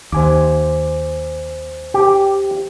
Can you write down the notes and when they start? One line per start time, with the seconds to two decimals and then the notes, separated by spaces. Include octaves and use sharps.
0.12 D#2 C5 G#5 D6
1.94 G4